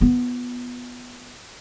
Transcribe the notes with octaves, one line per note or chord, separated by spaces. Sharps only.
B3 F4